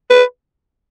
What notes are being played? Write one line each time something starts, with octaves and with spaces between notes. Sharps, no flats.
B4